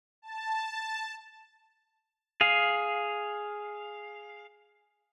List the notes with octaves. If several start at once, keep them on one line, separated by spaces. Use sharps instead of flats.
A5
G#4 F5